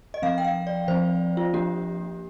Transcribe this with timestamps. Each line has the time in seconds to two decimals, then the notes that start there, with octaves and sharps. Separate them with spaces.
0.14 D#5
0.22 F3 C4 F5
0.38 G5
0.45 F5
0.67 D5
0.88 F3 C4 C5
1.37 F4
1.54 F3 A#3 D4 G4